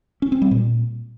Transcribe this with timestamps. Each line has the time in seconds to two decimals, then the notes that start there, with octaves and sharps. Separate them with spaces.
0.22 C#4
0.32 C4
0.42 G3
0.51 A#2